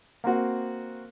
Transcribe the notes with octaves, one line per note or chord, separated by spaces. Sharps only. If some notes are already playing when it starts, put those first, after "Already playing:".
A#3 C4 F#4